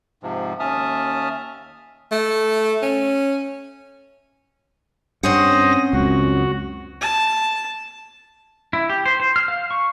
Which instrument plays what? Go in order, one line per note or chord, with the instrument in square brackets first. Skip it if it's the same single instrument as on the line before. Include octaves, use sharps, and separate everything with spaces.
[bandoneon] G#2 C3 F3
D#2 C#4 E5 A5 D#6 F6
[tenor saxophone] A3
C#4
[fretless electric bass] G2 [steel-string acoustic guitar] C4 C#4 F#5 [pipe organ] C5 D#6 A#6
[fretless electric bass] C#2 F#2 [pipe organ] F#4
[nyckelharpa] A5
[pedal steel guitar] E4
G4
C5
C5
F6
F5
C#6